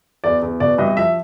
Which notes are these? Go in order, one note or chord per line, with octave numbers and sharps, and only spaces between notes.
E2 D5
E2
B2 D5
C2 D#5
F3 E5